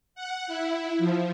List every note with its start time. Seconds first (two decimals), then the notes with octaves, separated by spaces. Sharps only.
0.15 F#5
0.47 E4
0.98 F3